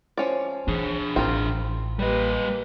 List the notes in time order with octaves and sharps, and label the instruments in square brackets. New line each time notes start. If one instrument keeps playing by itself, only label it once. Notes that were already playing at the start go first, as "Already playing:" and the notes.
[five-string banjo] F3 C#4 D5
[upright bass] E3 [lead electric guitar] D4 G#4
[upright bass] A1 [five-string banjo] C4 F4 A#4
[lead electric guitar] G3 D#5 [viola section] A#3 G4 B4